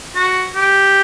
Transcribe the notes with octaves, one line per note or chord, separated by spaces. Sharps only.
F#4
G4